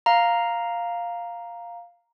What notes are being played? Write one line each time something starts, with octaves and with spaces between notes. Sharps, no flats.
F5 A#5